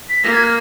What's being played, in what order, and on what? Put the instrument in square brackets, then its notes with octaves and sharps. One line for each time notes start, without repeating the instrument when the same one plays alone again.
[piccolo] B6
[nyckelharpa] A#3 [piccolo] A#6
[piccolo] G#6
F6